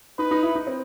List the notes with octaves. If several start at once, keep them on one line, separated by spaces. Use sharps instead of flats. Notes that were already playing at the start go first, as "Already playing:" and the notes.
D#4 B4
D#4
E4
D#4
C4